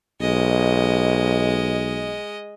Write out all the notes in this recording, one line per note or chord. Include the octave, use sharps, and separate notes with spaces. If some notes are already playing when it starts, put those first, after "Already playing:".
B1 G#3 D#5